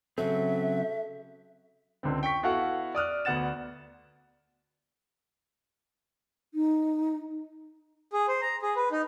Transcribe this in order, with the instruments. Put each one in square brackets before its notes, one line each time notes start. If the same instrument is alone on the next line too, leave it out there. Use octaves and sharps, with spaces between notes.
[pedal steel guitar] C#3 F#3 C4 [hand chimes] A4 [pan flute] E5
[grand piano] C#2 D3 C4
G5 C#6 B6
B3 E4 F#4 A4 F5 F#5
D5 D#6 F6 F#6
D2 B3 D5 F#5 A6 E7
[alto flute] D#4
[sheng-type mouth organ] G#4
C5
A#5
G#4
B4
D#4